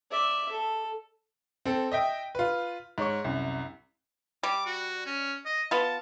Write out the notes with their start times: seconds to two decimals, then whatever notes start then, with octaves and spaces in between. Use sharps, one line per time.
0.11 D5 E5
0.52 A4
1.65 C4 A4
1.92 D#5 E5 G5
2.35 F4 B4
2.98 G#2 C#5 C#6
3.24 C2 F#2
4.43 G3 D6
4.66 F#4
5.06 C#4
5.45 D#5
5.71 B3 F4 A5